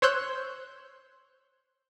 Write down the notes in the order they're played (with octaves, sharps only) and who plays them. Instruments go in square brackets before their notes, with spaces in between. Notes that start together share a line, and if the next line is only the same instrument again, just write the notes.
[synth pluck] C5 C#5 C6 E6 F#6 G6